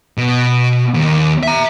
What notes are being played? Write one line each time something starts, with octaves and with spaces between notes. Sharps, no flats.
B2
D#2
E5 A#5